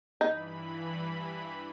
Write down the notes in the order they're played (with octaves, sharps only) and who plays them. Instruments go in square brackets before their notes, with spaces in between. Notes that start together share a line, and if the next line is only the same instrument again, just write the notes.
[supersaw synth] G2 E3 B5 [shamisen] D#4